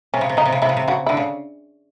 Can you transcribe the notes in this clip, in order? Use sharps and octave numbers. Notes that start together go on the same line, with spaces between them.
C3 C#4
C#3
C3
C#3 D#4
C3
C#3
C3 E4
C#3
C3
C#3 F#4
E4
D3
C#3